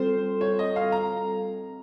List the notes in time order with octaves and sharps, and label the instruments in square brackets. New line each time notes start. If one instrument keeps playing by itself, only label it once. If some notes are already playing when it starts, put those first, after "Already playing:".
Already playing: [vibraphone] G3 C4 F4 A4 [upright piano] C5
[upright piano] C#5
D#5
F5
A#5